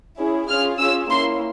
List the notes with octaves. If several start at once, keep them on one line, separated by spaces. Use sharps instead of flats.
C#4 E4 G#4
C#4 F4 G#4 F6
C#4 F4 G#4 E6
A#3 C#4 E4 C6